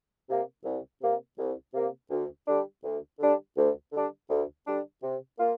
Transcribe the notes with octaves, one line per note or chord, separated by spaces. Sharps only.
C3 A#3
C2
C3 A#3
C2
C3 A#3
D2
D3 G3 D4
D2
D3 G3 D4
D2
D3 G3 D4
D2
D3 G3 D4
C3
A#3 F4